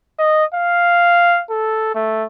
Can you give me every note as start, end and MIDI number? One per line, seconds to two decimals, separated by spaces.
0.19 0.45 75
0.55 1.43 77
1.50 1.95 69
1.95 2.25 57